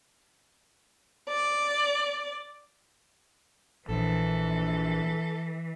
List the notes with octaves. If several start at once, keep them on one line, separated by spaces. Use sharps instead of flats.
D5
A#1 E3 A4